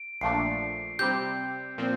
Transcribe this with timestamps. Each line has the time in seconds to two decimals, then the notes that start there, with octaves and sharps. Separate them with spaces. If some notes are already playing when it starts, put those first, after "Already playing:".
Already playing: D7
0.21 A#1 A#2 F3 A3 D4 C7
0.99 C3 G3 C4 G4 G6
1.78 A#2 F3 C4